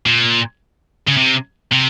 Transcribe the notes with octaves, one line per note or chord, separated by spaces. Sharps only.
A#2
C#3
C3
C3